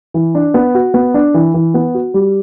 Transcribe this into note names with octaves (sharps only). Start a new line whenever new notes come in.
E3
D4
B3
F#4
B3
D4
E3
E3
B3
F#4
G3